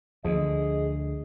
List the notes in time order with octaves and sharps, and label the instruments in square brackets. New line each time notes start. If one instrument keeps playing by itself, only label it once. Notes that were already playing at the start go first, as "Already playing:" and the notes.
[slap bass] D2 [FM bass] F3 [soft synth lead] G#4 [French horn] D#5